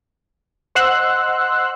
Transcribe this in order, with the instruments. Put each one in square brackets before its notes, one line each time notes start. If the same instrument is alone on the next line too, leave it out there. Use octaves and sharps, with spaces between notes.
[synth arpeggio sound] C5 D#5 F#5 C6 E6 F#6